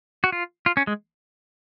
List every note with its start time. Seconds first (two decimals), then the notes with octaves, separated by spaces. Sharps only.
0.24 F#4
0.32 F4
0.66 F4
0.77 C#4
0.87 G#3